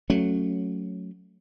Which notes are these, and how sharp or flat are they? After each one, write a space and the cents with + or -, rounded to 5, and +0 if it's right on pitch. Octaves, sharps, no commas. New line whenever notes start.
F#3 -10 A3 +0 C#4 +0